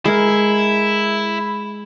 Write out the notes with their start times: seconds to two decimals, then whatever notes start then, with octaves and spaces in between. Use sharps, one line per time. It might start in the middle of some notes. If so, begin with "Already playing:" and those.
0.05 G#3 E4 A#4